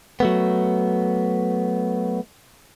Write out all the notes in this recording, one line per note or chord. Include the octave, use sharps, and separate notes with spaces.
F#3 A3 B3